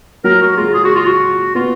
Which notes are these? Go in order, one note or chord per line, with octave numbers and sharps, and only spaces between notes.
F#3 A#4
F#4
G#3 F4
G#4
F#4
F4
F#4
B3 F4